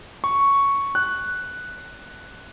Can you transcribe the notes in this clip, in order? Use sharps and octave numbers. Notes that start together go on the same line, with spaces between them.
C#6
F#6